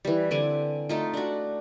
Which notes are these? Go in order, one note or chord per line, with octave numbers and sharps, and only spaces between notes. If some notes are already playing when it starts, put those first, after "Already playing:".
E3 G3
D3 C4 D5 G#5
A3 D#4 F4
D4 F#4